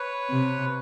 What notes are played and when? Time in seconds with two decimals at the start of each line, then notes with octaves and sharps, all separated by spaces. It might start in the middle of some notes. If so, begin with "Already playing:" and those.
Already playing: B4 C#5
0.30 C3